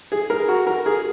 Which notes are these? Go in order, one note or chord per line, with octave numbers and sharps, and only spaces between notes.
G#4
A#4
F#4
A#4
G#4